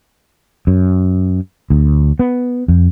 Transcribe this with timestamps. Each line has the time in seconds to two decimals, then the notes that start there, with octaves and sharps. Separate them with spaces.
0.67 F#2
1.70 D2
2.19 B3
2.68 F2